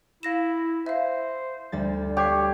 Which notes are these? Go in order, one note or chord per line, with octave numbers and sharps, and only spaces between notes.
E4 F5 A#6 E7
C5 E5 F5
D2 G3 A6
G4 C#5 F#6 G#6 C7